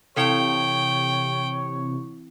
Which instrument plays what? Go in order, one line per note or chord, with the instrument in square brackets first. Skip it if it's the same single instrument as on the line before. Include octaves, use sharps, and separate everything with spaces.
[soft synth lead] C3 [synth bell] E3 C4 E4 [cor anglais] C#5 [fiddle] G5